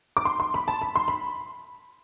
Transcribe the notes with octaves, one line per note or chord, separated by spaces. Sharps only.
D6
C6
C6
B5
A5
B5
C6
B5